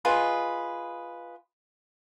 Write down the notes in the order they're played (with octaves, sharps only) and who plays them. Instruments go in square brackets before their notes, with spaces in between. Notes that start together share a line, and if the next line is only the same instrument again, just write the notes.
[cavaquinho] F4 G#4 B4 D#5